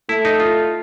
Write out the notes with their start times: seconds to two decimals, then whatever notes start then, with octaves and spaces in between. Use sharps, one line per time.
0.09 A3 E4
0.25 D#4
0.40 F4